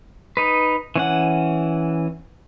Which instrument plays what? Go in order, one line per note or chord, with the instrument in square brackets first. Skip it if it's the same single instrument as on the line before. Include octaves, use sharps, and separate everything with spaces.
[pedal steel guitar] D#4 B4
E3 C#4 F#5